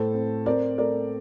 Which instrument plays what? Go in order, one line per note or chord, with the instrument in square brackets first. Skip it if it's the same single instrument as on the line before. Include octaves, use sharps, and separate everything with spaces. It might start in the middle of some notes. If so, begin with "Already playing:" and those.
Already playing: [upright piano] A2 A4 C5
C4
C4 A#4 D5
A3 A#4 D5